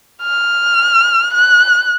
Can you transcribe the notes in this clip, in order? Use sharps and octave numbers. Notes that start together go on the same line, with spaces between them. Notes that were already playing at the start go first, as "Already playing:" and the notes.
F6
F#6